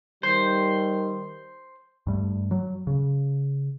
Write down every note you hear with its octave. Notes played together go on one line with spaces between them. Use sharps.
D#3 G3 C5
G2 G3 A3
F#3
C#3